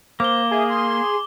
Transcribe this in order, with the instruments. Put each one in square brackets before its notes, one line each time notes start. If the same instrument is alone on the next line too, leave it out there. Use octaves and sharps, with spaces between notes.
[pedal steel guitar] A#3 [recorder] C5 [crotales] D6 G7
[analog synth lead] G#4 [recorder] E5
[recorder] C6